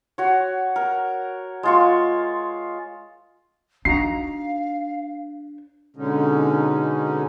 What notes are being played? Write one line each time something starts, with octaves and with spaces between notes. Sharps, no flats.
F#4 C#5
A#4
G#3 F4 C#6
D4 D#4 F#4 F5 A#5 C7
B2 D3 G#3 C#4 D#4